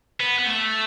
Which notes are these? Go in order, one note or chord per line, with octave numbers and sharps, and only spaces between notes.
B3
B3
A3